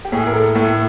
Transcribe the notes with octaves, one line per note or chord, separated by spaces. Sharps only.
G4
A2 G#4
A#4
A4
A2 A4